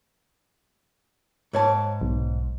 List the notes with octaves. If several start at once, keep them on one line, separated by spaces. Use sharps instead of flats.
G#2 C#5 A5
B1